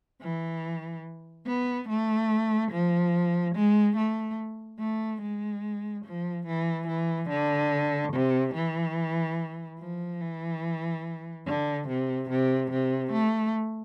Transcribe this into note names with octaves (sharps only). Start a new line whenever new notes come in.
E3
B3
A3
F3
G#3
A3
A3
G#3
F3
E3
E3
D3
C3
E3
F3
E3
D3
C3
C3
C3
A3